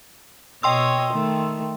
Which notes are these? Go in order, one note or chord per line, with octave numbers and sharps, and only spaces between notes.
B2 C#5 D#5 G5 C6 E6
D#3 A3